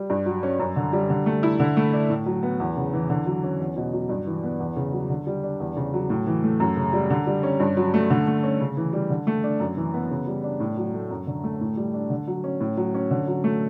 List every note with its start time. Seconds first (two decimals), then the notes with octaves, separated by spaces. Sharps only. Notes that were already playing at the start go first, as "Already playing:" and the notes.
Already playing: G3
0.10 G2
0.26 F#3
0.43 C#4
0.60 F#2
0.76 D3
0.93 G3
1.10 D3
1.26 A3
1.43 E4
1.60 D3
1.77 A3
1.93 D4
2.10 A2
2.26 F#3
2.43 B3
2.60 E2
2.77 C#3
2.93 E3
3.10 D3
3.26 F#3
3.43 C#4
3.60 E2
3.76 B2
3.93 F#3
4.09 G2
4.27 E3
4.43 B3
4.60 E2
4.76 C#3
4.93 F#3
5.10 D3
5.27 G3
5.43 D4
5.60 E2
5.77 C#3
5.94 F#3
6.10 A2
6.27 E3
6.44 A3
6.60 F#2
6.77 C#3
6.93 G3
7.10 D3
7.27 G3
7.43 C#4
7.60 G2
7.77 F#3
7.94 A3
8.10 D3
8.27 A3
8.43 C#4
8.60 C#3
8.77 E3
8.93 G3
9.10 D3
9.27 A3
9.44 D4
9.60 F#2
9.77 E3
9.94 B3
10.11 C#3
10.27 G3
10.44 D4
10.60 A2
10.77 F#3
10.94 A3
11.11 F#2
11.27 D3
11.44 A3
11.61 A2
11.77 G3
11.94 D4
12.10 D3
12.27 F#3
12.44 C#4
12.60 A2
12.77 F#3
12.94 C#4
13.11 D3
13.28 F#3
13.44 A3